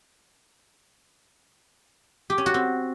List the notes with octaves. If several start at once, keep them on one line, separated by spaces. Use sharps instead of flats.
G4
C#4
F#4
C4